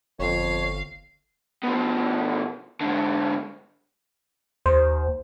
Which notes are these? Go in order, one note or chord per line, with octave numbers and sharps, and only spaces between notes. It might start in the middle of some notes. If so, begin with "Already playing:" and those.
G1 F2 C#5 F5
B2 F3
G#2 D3
D#2 C5